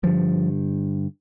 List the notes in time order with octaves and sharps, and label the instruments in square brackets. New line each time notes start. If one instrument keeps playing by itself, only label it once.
[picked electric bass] G2 D3 F3